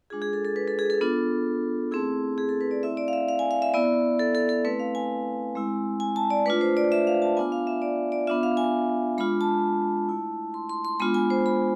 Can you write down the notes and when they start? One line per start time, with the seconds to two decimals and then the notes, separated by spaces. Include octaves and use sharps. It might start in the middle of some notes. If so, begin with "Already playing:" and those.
0.10 G#3 D4 F4 G#4
0.22 G#4
0.33 A4
0.45 A4
0.56 B4
0.68 A4
0.79 G#4
0.90 A4
1.01 B3 D4 F4 A4
1.91 A3 C4 E4 G#4
2.38 G#4
2.49 A4
2.61 B4
2.71 D5
2.82 A3 C4 E4 E5
2.97 D5
3.08 F5
3.13 E5
3.29 F5
3.39 G#5
3.51 F5
3.62 E5
3.74 B3 E4 D5
4.19 A4
4.35 A4
4.49 A4
4.65 A3 C4 E4 B4
4.79 F5
4.95 G#5
5.55 G#3 C4 E4
6.00 G#5
6.16 A5
6.30 D5
6.46 A3 D4 F4 B4
6.61 C5
6.77 D5
6.92 E5
7.07 F5
7.22 A5
7.37 B3 D4 F4 G#5
7.52 F5
7.67 E5
7.82 D5
8.12 D5
8.27 B3 D4 F4 E5
8.43 F5
8.57 G#5
9.18 G#3 D4 F4 B5
9.41 A5
10.09 A3 E4
10.54 C6
10.69 C6
10.85 C6
11.00 G#3 B3 D4 F4 B5
11.14 G#5
11.30 C5
11.46 B5